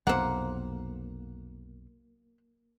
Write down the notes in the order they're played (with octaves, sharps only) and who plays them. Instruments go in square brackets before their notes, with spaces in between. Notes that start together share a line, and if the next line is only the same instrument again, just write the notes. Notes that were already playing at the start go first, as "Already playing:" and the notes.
[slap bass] B1 F2 C3 [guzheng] A#3 [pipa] C5 F#5